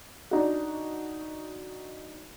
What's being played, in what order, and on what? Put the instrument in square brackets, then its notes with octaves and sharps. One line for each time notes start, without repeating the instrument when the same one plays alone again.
[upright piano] D4 D#4 F#4